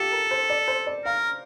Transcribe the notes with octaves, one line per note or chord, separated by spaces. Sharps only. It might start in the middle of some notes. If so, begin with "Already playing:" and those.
Already playing: F4 G4 A4
A#4
C5
D5
C5
D5
A#4 F5